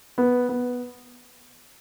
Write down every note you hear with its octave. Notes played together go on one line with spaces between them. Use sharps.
B3
B3